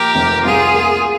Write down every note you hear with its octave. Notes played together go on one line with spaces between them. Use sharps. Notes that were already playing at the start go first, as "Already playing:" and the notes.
Already playing: A#1 G4 A#4
F1
C2 F4 G#4
A#3